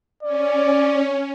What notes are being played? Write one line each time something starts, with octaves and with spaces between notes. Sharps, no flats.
C#4 D5